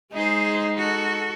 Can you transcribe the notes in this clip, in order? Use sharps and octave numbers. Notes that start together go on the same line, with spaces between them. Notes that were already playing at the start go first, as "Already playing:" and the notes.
G#3 D#4 G#4 C5
F#4 A4